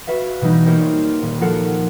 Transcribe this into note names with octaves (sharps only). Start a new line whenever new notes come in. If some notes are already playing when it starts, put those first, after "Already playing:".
F#4 B4 E5 F5
B2 E3 G3 D#4
A#3 G4 A#4 C5 C#5
F4 D5
D#1
F3 F4 A4 A#4 F#5 C#7